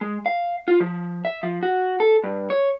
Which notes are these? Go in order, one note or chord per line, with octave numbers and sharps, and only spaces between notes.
G#3
F5
F4
F3
E5
F3
F#4
A4
G2
C#5